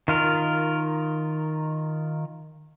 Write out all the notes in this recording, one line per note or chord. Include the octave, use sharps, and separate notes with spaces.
D#3 F4 A#4